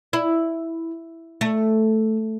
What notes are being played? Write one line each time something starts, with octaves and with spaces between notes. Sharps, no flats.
E4
A3